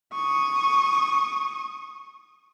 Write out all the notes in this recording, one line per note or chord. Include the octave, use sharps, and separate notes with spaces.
C#6 D#6